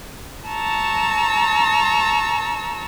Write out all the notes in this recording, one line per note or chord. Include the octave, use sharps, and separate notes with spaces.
A5 A#5 C#6 E6